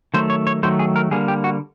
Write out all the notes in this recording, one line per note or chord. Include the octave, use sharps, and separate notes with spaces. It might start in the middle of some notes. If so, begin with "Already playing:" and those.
D#3 F#3 A3 C5
C#5
C#5
D#3 F#3 A3 C5
G#4
A#4
D3 G3 A#3 G#4
G4
F#4